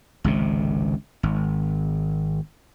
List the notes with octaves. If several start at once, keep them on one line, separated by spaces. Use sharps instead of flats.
G#1 C#2 C3
G#1